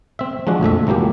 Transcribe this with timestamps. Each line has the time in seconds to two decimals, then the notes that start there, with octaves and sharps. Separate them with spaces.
0.19 C4 E5
0.47 F3 G#3 D4 F#4
0.61 A#1 F2 A3 E5
0.87 C#2 E3 F#3 A#3 G4